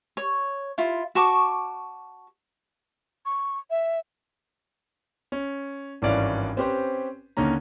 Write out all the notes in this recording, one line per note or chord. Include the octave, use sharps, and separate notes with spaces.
C#5
E4 F4
F#4 A5 C#6 D6
C#6
E5
C#4
G#1 G2 E3 C#4 D5 F5
C4 C#4 G4 B4 C5
D#2 D3 A#3 C#4 A#5